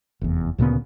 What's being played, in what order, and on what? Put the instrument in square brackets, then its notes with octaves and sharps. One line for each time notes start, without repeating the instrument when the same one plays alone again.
[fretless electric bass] F1 E2
D2 A#2 C#3 B3